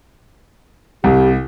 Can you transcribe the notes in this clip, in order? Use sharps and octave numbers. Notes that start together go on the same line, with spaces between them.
C2 G4